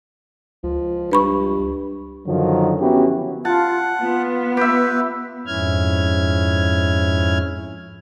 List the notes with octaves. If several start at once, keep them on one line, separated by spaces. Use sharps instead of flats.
C#2 F3
G2 B4 B5 C#6
F#2 D3 D#3 F3 F#3
B3 C#4 E4 F#4 G4
F4 F#5 A5
B3 F4
G4 B4 E5
F2 G#2 C#4 E4 F6 G#6